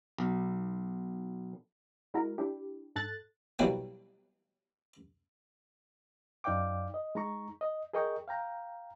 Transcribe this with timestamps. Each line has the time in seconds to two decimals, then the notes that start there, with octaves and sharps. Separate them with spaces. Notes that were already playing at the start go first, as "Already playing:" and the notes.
0.18 B1
2.14 G#3 E4 F#4 A#4
2.38 D4 E4 G4
2.96 G#2 A4 F#6 A6
3.59 B2 E3 F#3 G3 A#3
6.44 F#2 D#4 D5 F5 G5 D6
6.94 D#5
7.15 G#3 D#4 A#5 C#6
7.61 D#5
7.93 G#4 A#4 D#5 G5 C#6
8.28 F5 G5 A#5